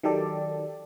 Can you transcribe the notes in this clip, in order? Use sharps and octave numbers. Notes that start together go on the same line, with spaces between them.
D#3 F#3 G4 A4 D5